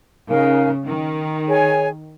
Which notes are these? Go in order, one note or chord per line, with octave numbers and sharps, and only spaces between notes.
C#3 D#4 A#4 F5 G#5
D#3
G#4 C#5 G#5